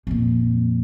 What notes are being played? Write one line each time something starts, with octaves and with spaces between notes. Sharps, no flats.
F2 A#2